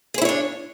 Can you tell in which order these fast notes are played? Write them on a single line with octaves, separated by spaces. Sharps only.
G#4 C5 E4 C#5 D4